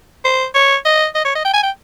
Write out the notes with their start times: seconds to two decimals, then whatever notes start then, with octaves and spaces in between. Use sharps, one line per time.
0.25 C5
0.55 C#5
0.85 D#5
1.15 D#5
1.25 C#5
1.35 D#5
1.45 G5
1.54 G#5
1.63 G5